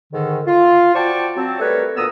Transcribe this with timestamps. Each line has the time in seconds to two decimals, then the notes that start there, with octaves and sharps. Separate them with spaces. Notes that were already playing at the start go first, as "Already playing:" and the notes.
0.11 G#2 D3 D#3
0.46 F4
0.93 F#4 C5 D5 G5 A5 C#6
1.36 F#3 C4 A5
1.60 G3 A3 A#4 B4 C#5
1.96 D2 A#2 B3 A#5 D#6 E6